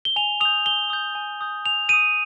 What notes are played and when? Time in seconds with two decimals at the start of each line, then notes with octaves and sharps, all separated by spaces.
0.05 G7
0.16 G#5 F7
0.41 D#6 G6 F7
0.65 G#5 G7
0.90 D#6 G6
1.15 G#5
1.41 D#6 G6
1.66 G#5 F7
1.89 D#6 G6 D#7